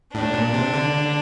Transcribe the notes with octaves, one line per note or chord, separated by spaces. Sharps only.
A2 D4
A#2
C3
D3